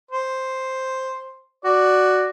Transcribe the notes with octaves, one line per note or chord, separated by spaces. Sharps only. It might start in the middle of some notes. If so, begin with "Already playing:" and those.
C5
F#4 D5